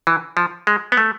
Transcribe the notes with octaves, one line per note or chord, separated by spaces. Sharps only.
E3
F3
G#3
B3
A3